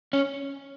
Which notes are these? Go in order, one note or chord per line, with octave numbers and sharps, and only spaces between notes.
C#4